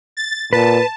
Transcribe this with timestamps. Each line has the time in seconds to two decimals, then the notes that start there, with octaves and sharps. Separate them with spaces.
0.17 A6
0.53 A#2 B4 A5